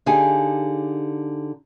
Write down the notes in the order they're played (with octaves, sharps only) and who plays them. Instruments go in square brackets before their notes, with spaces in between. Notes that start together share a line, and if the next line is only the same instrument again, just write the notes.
[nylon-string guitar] D3 D#4 G4 G#4 F5 G#5